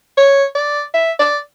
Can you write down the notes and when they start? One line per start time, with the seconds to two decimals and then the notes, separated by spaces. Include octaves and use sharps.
0.17 C#5
0.55 D5
0.94 E5
1.19 D5